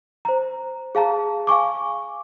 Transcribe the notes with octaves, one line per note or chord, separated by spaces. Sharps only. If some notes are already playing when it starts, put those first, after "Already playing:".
C5 A#5
G#4 F5 A5 A#5
F5 G#5 C#6 D6